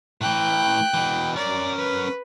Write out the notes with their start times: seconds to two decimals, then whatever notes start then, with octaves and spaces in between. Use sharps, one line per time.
0.21 A2 E3 G5 F#6
0.94 B2 E3
1.36 C#4 A#4 D5
1.76 B4